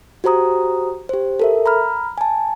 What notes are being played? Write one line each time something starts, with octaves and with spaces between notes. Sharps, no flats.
F#4 G4 C5 A#5 D#6
G4 C5
A4 A#4 E5
A#5 B5 F6
G#5 A5